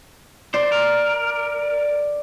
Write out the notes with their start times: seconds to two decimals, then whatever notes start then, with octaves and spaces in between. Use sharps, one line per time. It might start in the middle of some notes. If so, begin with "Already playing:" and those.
0.54 C5 D5
0.72 A#4